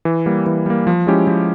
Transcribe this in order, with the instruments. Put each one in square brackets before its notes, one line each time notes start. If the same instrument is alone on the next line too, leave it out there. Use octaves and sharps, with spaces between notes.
[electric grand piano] E3
G3 A#3
E3
G3 A#3
F3
G#3 C#4 E4 G4
F3